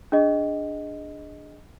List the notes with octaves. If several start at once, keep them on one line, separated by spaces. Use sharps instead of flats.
D4 G#4 D#5